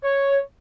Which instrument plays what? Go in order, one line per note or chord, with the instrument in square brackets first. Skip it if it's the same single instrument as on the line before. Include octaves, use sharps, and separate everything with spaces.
[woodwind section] C#5